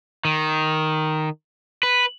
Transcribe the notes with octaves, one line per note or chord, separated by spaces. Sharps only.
D#3
B4